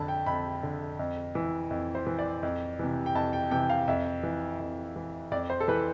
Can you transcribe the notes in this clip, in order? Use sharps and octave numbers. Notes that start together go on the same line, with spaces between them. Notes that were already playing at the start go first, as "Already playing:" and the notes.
Already playing: F2 D3 A5 B5
G5
F2 B5
D3
F2
E3
F2
C5
E3
D5
F2
C3 E3
G5
F2 A5
G5
C3 E3 G5
F5
F2 E5
E3
F2
E3
F2 D5
C5
A4
E3 B4